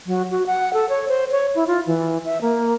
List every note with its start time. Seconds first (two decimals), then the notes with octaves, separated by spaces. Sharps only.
0.06 F#3
0.31 F#4
0.47 F#5
0.73 A4
0.89 C#5
1.08 C5
1.31 C#5
1.55 E4
1.67 F4
1.87 E3
2.25 E5
2.42 A#3